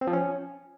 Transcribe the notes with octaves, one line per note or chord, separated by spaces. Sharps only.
C4
F3
C#4